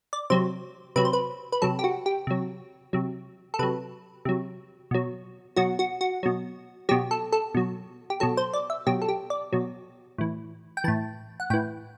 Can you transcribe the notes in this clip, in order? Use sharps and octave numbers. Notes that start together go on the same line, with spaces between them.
D5
C3 F#3 C5
C3 F#3 B4
C5
B4
B4
C3 F#3 A4
G4
F#4
G4
C3 F#3
C3 F#3
A4
C3 F#3 B4
C3 F#3
B2 F#3
B2 F#3 F#4
F#4
F#4
B2 F#3
B2 F#3 G4
A4
A4
B2 F#3
G4
B2 F#3 A4
C5
D5
E5
B2 F#3 G4
A4
G4
D5
B2 F#3
A2 E3
G5
A2 E3 A5
F#5
A2 E3 G5